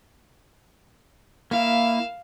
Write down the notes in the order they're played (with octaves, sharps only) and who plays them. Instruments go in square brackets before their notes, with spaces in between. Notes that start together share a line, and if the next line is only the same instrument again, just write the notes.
[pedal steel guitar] A#3 E4 [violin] F5 E7